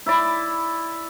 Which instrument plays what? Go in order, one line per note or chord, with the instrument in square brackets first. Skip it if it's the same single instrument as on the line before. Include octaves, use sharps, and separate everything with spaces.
[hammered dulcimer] E4 D5